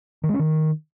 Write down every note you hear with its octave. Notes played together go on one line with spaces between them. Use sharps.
D#3
G#3
C#4
D#3